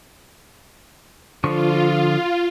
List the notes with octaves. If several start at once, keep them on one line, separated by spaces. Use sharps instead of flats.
D3 F3 F4 C#6